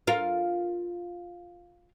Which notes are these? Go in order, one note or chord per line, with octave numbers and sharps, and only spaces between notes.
F4 A#4